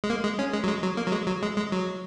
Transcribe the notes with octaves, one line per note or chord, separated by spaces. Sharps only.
G#3
A#3
G#3
C#4
G#3
F#3
G#3
F#3
A#3
F#3
G#3
F#3
G#3
G#3
F#3